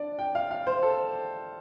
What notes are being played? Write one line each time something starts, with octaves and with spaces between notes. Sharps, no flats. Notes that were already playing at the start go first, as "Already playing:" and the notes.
Already playing: D4 D5
G5
F5
F5
C5
A4